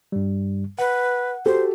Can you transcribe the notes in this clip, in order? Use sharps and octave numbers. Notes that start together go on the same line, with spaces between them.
G2 G3
B4 F#5
F#4 G4 A4 C5